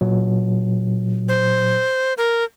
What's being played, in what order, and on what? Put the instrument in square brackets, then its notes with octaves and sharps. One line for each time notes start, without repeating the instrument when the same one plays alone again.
[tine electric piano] A#2 F#3
[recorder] C5
A#4